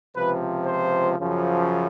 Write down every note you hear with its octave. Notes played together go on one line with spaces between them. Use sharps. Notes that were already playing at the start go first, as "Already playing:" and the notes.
C#2 C3 F3 B4
C5
F#2 C#3 F3